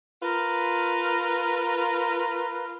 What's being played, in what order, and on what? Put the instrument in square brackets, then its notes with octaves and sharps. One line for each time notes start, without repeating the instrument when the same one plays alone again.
[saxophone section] F4 A#4 B4